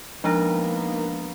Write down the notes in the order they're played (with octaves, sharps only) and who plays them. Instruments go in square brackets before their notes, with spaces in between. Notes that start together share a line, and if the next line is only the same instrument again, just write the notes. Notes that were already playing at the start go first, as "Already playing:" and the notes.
[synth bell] F3 G#3 D4 [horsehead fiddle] A#3 B3 [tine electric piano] D#4 A#4